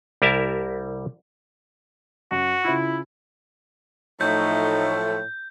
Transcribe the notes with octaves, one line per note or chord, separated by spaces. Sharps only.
C2 G3 E4 A#4 E5 A5
F#2 F#4
C#3 E4 F4
A2 F3 F#3 A3 D#4 G6